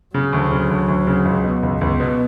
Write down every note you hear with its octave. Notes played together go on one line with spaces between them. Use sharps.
C#3 F#3
D2
C#3
D2
D2
C#3
C#2
B2
C#2
C#2 B3
B2